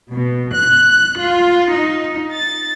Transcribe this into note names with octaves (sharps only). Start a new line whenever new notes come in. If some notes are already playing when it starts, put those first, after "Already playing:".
B2
F#6
F#6
F4
D#4
A6